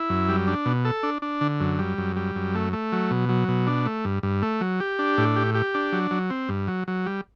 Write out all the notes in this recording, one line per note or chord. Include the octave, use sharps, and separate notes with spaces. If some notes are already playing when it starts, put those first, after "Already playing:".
Already playing: E4
F#2
G3
D4
B2
A4
D4
D4
D3
F#2
G3
F#2
G3
F#2
A3
A3
F#3
B2
F#3
B2
D4
A3
G2
G2
A3
F#3
G4
D4
A2
G4
G4
D4
F#3
F#3
C4
G2
F#3
F#3
G3